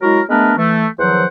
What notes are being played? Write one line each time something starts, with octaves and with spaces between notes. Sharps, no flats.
F#3 G#3 E4 F#4 A#4
G#3 A3 B3 D4 A#4 B4
E3 A3
E2 D#3 F3 F#3 C5 F#5